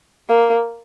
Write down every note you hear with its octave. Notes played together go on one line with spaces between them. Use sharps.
A#3